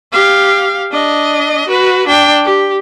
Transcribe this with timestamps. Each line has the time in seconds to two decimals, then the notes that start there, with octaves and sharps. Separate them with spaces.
0.12 G4 F5
0.92 D4 D#5
1.68 F#4 B4
2.08 D4 G5
2.44 G4